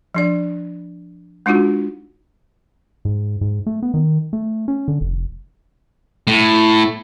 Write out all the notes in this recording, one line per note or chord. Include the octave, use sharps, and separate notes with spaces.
F3 D4 D5
G#3 D4 D#4 F4 F#4
G#2
G#2
A3
B3
D#3
A3
C#4
D3
F1
A2